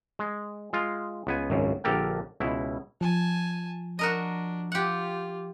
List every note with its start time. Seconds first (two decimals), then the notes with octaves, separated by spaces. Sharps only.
0.19 G#3
0.73 G#3 F4
1.27 C#2 B3 G#5
1.50 G#1 C#2 F#2
1.84 A#1 D3 G4 A4 A#4 G5
2.40 C#2 B2 E4
3.01 F3 G#5 A5
3.99 D4 F#4 A#4 D#5
4.72 F4 G4 F#5